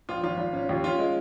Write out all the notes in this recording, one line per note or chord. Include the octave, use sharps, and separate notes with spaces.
A#1 F4
G#1 F4
G#1
C#4
D#2
C#4 F4
G#3